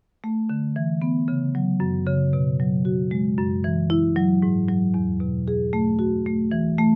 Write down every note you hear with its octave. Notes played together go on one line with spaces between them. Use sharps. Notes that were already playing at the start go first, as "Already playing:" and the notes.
A3
D3
E3
B3
C#3
F#3
F#2
C#3
B2
F#3
F#4
G#3
F#2
E3
E4
F#3
G#2
F#3
E2
B2
G#4
A3
F#4
A3
E3
A3